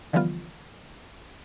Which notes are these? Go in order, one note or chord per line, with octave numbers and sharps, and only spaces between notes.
D3 E3 F3 G3 B3 F4